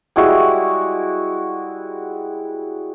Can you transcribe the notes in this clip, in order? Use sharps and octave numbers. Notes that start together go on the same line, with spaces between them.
G3 G#3 E4 F#4